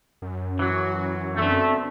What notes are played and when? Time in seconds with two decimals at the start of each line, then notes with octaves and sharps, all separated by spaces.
0.22 F#2
0.59 E3 F#3 F#4
1.35 D3 A3 B3 C4